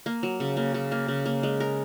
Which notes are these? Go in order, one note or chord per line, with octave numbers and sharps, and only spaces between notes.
A#3
F#3
C#3
A#3
C#3
A#3
C#3
A#3
G#3
A#4